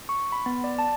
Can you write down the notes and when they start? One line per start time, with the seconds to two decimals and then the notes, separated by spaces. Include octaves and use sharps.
0.09 C#6
0.32 B5
0.46 B3
0.64 D5
0.79 A5